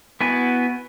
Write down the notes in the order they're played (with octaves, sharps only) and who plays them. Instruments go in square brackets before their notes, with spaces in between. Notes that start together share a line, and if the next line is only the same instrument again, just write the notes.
[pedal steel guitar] B3 E4 F#4 G#5